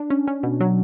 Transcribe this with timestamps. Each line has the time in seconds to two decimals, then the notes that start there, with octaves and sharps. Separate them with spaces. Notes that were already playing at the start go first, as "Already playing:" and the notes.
Already playing: D4
0.10 C#4
0.28 C#4
0.43 B2
0.60 F#3